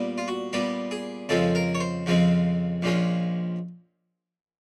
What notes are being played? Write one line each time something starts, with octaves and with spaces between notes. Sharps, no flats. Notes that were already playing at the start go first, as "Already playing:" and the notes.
Already playing: A#2 G3 B3
F4
F#4
A#2 G3 B3 G4
G#4
F2 C#3 F3 G#3 C4 A4
A#4
C#5
C5
F2 C#3 F3 G#3 C4
A#1 A#2 F3 G#3 C#4